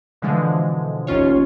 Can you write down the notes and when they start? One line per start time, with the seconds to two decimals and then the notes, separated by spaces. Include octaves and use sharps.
0.22 B2 D3 E3 F3 G#3
1.07 A1 D#2 C#4 F4 C#5